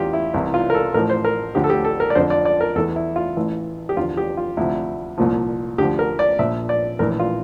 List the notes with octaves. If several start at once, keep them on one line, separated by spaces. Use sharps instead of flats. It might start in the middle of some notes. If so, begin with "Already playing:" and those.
Already playing: E2 E3 F4 G4
E4
C2 C3 E3 E4
F4
A#4
A4
A1 A2 F3 A#4
C5
A#4
D2 D3 F3 G4
A4
G4
A4
A#4
D5
F2 D3 F3 C5
D5
D5
A#4
E2 E3 A4
E4
F4
A1 A2 E3
G4
E2 D3 F3 F4
G4
F4
D2 C3 F3 E4
C2 A#2 F3
D2 D3 F3 G4
A#4
D5
A#1 A#2 F3 E5
D5
A#1 A2 E3 A#4
F4